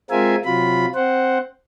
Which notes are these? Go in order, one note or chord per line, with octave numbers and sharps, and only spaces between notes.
G#3 C4 F4 A#4 E5 G#5
C3 F#3 F4 B5
C4 C5 F#5